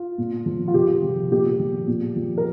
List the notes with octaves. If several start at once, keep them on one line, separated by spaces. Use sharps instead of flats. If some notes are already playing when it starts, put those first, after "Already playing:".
Already playing: F4
A#2
F3
F4
C3 G4
F3
A#2 G4
F3
A#2
F3
A#4